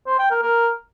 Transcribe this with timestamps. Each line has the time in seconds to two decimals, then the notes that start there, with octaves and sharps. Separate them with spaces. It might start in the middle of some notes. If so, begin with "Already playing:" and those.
0.07 C5
0.19 G5
0.31 A#4
0.43 A#4